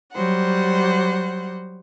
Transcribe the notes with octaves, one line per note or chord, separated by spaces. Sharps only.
F#3 G3 C5 F#5